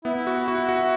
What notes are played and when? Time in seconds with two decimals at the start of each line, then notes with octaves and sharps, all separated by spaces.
0.05 B3 E4
0.27 F#4
0.48 F#4
0.69 F#4